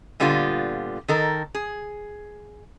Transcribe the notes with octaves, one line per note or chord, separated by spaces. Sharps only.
A#2 D3 G3 B3 F4
D#3 A4 A#4
G#4